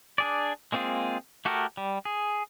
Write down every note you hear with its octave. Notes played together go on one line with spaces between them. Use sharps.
D4 G#4 D5
G#3 A#3 C4 F4 G#4
A3 F#4 G4 A4 A#4
G3
G#4